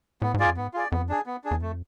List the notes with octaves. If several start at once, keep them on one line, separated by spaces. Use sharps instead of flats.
A2 B3
G#2
F4 G#4 D5
F2
G#2 B3
F4 G#4 D5
F2 B3
D4 G#4
B3
D4 G#4
E2
F2 A3